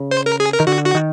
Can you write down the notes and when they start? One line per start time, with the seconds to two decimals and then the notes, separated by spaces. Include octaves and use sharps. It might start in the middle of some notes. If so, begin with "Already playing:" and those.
Already playing: C#3
0.11 C5
0.26 A#4
0.40 G#4
0.53 A#4
0.60 D#3
0.67 D3 F#4
0.86 F#4
0.95 D#3